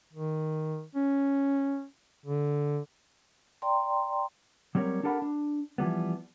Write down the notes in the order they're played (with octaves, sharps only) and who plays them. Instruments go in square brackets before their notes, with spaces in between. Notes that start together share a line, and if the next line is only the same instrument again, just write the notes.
[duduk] D#3
C#4
D3
[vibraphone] D5 G5 A#5 C6
[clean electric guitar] F#3 G3 C4 A#4 C#5
D4 G4 A4 A#4 F#5 B5
D4
E3 F3 G3 B3